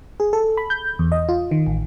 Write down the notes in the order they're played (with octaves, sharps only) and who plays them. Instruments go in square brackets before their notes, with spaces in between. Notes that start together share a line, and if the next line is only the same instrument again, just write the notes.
[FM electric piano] G#4
A4
B5
G6
E2
D#5
F4
D#3
A1